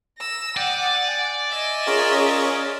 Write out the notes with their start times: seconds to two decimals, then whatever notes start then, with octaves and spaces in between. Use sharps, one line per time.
0.18 E6 A#6
0.57 D5 F#5 G5 D6 D#6
1.08 G#5
1.51 D#5 E5
1.87 C#4 F4 G#4 A#4 C#5